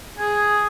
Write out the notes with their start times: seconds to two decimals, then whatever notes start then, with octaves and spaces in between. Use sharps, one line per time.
0.18 G#4